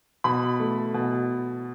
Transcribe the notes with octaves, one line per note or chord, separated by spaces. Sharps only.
B2 B5
A3
B2